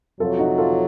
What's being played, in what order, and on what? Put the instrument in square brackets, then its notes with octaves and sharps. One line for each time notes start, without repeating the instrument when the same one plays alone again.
[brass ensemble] F2 C3 F#3 [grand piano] F4 A4
[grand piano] D#4 F#4
F4 A4